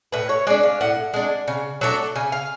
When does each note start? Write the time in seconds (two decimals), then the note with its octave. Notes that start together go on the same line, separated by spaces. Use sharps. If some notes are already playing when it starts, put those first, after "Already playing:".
0.12 A2 B4
0.29 C#5
0.47 G#3 D4 D5
0.63 F5
0.81 A2 F#5
1.14 G#3 D4
1.48 C#3
1.81 F#3 A3 D4
2.16 C#3 G#5
2.32 F5